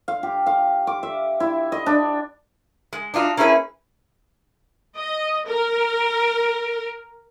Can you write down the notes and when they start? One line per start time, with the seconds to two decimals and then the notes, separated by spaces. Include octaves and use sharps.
0.08 F5
0.23 G4
0.46 F5
0.87 D6
1.03 E5
1.40 E4
1.72 D#5
1.86 D4
2.93 G#3
3.14 D4 D#4 F4 F#4
3.37 A#3 C#4 E4 G#4 B4
4.98 D#5
5.46 A#4